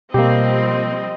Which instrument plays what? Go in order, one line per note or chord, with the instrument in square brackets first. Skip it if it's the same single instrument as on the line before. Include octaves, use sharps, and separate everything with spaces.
[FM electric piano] B2 [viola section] F3 G3 C4 [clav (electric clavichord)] A#3 G4 [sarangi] D#5